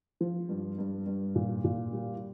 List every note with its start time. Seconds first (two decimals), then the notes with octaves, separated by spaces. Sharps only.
0.21 F3
0.49 G2
0.78 G2
1.06 G2
1.35 A#2
1.64 A#2
1.93 G3